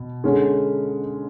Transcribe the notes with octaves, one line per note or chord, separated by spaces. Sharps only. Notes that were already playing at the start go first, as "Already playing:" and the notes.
Already playing: B2
D3 G#3 C#4